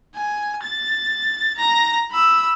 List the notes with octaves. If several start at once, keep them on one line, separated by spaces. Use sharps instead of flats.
G#5
A6
A#5 A#6
B5 E6